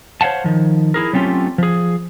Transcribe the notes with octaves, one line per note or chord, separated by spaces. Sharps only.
C5 C#5 F5 F#5 A5
D#3 F3
E4 G#4 A#4
F#3 A3 C4 C#4 F4 G4
F3 G#4